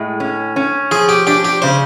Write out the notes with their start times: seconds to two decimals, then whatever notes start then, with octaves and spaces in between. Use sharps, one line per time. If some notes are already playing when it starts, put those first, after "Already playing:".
Already playing: A2 G#3
0.20 C#4
0.56 C#4
0.91 F3 G#4
1.09 G4
1.27 D4 G4
1.45 G4
1.62 C#3 C5